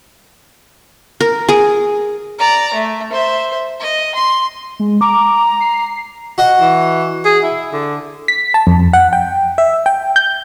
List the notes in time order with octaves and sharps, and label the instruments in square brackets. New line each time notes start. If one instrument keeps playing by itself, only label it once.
[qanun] A#4
G#4
[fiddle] D5 A#5
A3
C5 E5
D#5
C6
[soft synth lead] G#3
[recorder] A#5 [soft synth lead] D6
[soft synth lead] C7
[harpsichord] F#4 D#5
[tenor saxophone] E3
G#4
E4
D3
[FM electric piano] B6
A5
F2
F#5
G5
E5
G5
G6